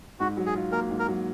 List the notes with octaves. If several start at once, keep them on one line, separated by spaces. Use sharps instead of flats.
G#2 F#4
F#3
G#4
F4
A#3 A#4
G#2
A#4
F#3